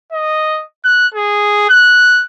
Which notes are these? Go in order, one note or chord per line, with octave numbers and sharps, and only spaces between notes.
D#5
F#6
G#4
F#6